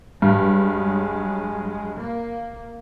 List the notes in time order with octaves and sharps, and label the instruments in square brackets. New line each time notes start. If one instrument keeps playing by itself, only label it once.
[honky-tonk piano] G2 [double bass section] F#3 G#3
[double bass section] A#3